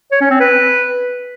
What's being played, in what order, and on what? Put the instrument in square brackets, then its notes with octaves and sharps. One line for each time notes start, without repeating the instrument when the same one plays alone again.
[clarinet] C#5
C#4
C4
B4